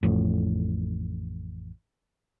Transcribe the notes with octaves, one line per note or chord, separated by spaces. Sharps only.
A1 F2 A2